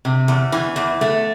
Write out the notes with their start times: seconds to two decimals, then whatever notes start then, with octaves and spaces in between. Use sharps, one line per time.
0.05 C3
0.28 E2
0.52 E3
0.76 E2
1.01 A3